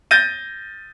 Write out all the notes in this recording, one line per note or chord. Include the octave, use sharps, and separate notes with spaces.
G6 A6 A#6 D#7